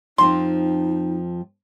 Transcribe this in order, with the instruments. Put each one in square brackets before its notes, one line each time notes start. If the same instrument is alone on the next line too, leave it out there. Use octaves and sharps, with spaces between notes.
[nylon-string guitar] F2 F3 C4 [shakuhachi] D#4 [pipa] C6